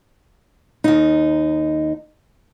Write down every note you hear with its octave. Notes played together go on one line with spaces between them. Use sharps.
D#2 D#4